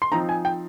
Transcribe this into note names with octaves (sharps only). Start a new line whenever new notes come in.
C6
F3 C4 D#4 A#5
G#5
G5